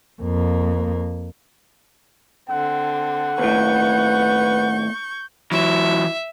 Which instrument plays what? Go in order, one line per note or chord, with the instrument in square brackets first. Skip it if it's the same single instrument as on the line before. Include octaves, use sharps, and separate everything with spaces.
[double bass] F2 A#3
[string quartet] D3 C4 [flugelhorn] F#5
[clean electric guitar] D#2 A2 [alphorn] B4 [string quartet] C#6 G6
[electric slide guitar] E3 F#3 [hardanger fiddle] E5